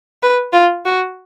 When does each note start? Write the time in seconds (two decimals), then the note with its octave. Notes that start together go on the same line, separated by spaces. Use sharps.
0.22 B4
0.53 F4
0.85 F#4